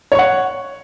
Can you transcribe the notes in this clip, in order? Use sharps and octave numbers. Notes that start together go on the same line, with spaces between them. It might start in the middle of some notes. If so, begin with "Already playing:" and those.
C#5 F#5 C#6